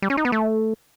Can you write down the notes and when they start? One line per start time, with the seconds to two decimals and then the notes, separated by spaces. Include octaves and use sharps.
0.02 G3
0.10 C#4
0.17 D#4
0.25 B3
0.32 A3